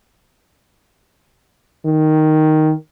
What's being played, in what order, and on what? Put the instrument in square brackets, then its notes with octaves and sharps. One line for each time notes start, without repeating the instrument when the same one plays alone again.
[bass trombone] D#3